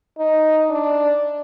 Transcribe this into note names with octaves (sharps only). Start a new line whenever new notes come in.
D#4
D4